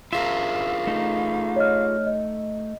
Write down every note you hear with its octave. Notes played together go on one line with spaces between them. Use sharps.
F4 G#4 A#4 E5 F5
A3 D#4
C#5 D#5 F6
D#5